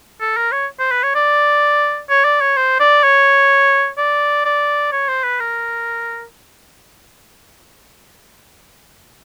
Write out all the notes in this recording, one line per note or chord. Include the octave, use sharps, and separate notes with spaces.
A4
A#4
C#5
C5
B4
C#5
D5
C#5
D5
C#5
C5
D5
C#5
D5
D5
C#5
C5
B4
A#4